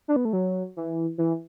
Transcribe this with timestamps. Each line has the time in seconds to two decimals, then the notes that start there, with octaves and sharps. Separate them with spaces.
0.08 D4
0.16 B3
0.25 A3
0.33 F#3
0.76 E3
1.18 E3